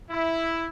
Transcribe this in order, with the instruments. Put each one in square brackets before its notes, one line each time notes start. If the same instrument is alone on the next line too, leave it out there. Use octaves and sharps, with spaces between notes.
[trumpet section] E4